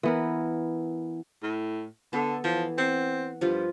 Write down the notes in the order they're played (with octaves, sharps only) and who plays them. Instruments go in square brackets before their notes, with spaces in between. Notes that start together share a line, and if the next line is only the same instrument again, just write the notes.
[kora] E3 B3 A#4
[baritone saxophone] A2
[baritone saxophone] D3 [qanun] B3 A4
[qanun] E3 [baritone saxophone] F3
[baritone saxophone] C4 [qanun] F#5
[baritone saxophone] G2 [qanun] F3 F4 B4